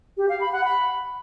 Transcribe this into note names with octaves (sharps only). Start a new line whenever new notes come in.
G4
F5
B5
F#5
B5